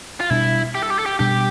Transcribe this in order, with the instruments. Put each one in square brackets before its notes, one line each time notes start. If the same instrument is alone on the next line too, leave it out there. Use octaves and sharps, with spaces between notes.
[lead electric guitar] F4
[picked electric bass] B2 G3 D4 [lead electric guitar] E4
[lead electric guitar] G4
A4
G4
A4
G4
[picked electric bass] B2 G3 D4 [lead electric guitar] G4